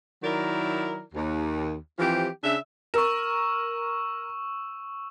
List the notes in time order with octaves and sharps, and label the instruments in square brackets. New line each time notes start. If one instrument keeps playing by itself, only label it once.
[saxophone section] D#3 F#3 E4 A#4 D5
D#2
E3 F3 C4 G4
C#3 D4 E5
[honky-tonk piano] A#4 [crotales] C#6 E6 E7